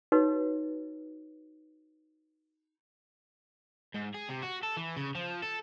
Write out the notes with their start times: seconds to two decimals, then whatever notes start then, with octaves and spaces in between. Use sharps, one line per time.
0.12 D#4 F#4 B4 C#5
3.95 G#2
4.15 G#4
4.29 C3
4.43 F#4
4.63 A4
4.77 E3
4.97 C#3
5.15 F3
5.42 A4